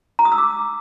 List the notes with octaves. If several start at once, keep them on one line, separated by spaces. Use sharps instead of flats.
A#5
D#6
E6
D6